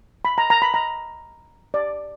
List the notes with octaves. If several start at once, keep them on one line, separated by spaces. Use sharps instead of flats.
B5
A#5
A#5
B5
A#5
D5